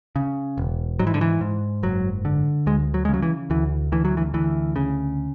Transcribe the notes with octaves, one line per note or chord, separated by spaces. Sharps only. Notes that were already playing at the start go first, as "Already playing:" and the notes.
C#3
E1
G#2 F#3
E3
D3
E3
G#2
F#1 F#3
D3
D2 G#3
F#3
G#3
C#3
F#3
E3
D2 E3
D2 E3
F#3
E3
D2 E3
C#3